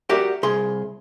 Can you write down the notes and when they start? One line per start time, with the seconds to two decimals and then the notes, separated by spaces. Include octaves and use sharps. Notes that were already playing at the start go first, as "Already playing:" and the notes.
0.09 F#4 G4 A#4 D5 E5 F#5
0.43 C2 G#4 C6